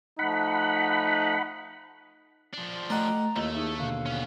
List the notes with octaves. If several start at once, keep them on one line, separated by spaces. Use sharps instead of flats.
F3 A3 D#4 F#5 B5
F3 D4
A3 D5 D#5 F#5 G5 A#5
D#2 A3 E4 F4 D#5
D#4 E4 G#4 E5
B2 D3 F5
B3 C#4